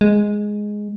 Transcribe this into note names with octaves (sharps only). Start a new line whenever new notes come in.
G#3